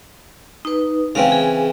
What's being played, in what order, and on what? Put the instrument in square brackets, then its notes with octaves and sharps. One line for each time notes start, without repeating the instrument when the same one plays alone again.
[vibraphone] D#4 B4
[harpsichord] C#3 E3 C4 [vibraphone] F5
[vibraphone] G#4